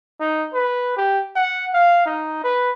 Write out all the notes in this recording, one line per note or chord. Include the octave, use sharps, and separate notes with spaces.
D#4
B4
G4
F#5
F5
D#4
B4